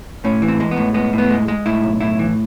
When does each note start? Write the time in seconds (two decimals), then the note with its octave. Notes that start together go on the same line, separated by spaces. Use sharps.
0.24 A2 C#4
0.42 E3
0.48 C4
0.60 G#3
0.71 B3
0.77 A2
0.94 G#3 B3
1.13 A2
1.18 B3
1.30 G#3
1.48 G#3
1.66 A2 E4
1.83 B1
2.01 A2 E4
2.19 E3